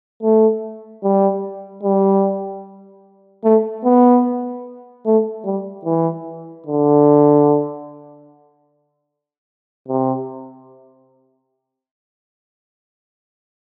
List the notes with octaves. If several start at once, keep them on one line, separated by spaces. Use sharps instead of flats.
A3
G3
G3
A3
B3
A3
G3
E3
D3
C3